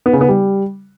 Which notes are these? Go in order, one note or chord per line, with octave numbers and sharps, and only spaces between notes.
B3
C#3
B3
G3